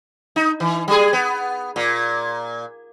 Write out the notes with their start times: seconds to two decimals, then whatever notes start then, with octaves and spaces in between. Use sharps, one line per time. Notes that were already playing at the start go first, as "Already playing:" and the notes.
0.36 D#4
0.60 E3
0.88 G3 G#4
1.13 B3
1.76 A#2